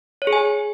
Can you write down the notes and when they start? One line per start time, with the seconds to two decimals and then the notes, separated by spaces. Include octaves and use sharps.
0.22 C#5
0.27 G#4
0.33 G#5